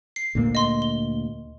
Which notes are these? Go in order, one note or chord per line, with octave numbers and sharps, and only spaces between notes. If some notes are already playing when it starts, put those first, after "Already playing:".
C7
D2 A#2 A#3
D#5 C6
G7